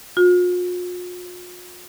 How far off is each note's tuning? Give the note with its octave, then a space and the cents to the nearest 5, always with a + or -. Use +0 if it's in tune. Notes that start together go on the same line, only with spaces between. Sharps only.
F4 +45